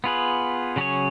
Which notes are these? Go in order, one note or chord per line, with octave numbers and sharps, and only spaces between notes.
B3 F4 G#4 B4
C#3 F#3 C#4 G#4 C#5